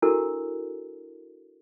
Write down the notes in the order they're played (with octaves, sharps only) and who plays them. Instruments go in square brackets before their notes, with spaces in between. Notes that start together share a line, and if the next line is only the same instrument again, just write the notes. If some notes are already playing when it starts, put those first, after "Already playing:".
[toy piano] D4 E4 F#4 A4 A#4